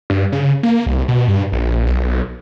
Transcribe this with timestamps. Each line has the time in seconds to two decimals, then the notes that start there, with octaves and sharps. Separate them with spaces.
0.10 G2
0.32 C#3
0.63 A#3
0.86 C2
1.08 B2
1.28 G2
1.52 A#1
1.87 B1